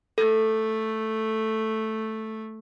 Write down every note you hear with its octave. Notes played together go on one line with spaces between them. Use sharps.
A3 A4